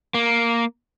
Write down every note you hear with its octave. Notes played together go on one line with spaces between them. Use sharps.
A#3